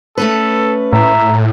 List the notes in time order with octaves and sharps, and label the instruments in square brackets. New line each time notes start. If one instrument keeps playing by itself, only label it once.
[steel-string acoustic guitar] A3 C#4 B4 [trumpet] A4
[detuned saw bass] A2 [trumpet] E5 [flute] A#5